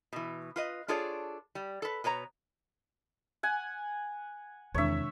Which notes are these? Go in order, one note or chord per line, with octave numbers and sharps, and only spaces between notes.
B2 E3
F4 B4 D#5
D4 F4 G#4 A4 C#5 D5
G3
A4 B4
B2 B4 C#5 A#5
F#5 G#5
E2 C3 D#3 G#3 D4 C#5 E5